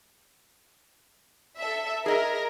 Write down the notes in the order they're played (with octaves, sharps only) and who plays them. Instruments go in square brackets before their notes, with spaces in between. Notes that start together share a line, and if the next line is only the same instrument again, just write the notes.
[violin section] A4 E5
[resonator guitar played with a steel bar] G#4 D#5 E5 [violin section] A#4